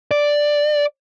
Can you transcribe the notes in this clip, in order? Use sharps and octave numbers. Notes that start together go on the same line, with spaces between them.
D5